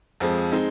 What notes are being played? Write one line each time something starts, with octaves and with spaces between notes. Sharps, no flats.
F2 F3 G#3
G#3 C4 D#4